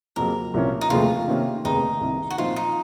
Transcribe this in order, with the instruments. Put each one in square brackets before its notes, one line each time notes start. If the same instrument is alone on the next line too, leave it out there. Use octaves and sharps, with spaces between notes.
[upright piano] F2 C#3 F#3 A#3 [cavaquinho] A#4
[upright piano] C2 A#2 F3 A#3 C#4
[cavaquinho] D#4
[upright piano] F1 D#2 C#3 F3 A3 [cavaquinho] F4
[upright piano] C3 D#3 A#3 C#4
[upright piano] F1 D#2 C#3 [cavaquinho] D#4
[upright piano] C2 C3 D#3
[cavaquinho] F#4
[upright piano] A#2 F3 C4 D#4 [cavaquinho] F4
[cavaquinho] D#4